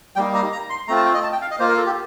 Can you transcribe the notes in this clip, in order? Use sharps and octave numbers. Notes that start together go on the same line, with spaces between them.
G3 A#3 D#4 G5
A#5
A#5
C6
A3 C4 F4 A#5
A5
G5
D#5
A5
G5
F5
D#5
A#3 F4 C5
A#4
A4
G4